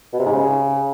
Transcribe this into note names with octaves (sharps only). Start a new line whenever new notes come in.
B2
C3
G#2
C#3